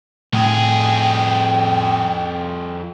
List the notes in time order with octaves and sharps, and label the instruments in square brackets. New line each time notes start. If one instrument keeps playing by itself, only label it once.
[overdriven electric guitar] F2 G#4 [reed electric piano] A2 [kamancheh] G5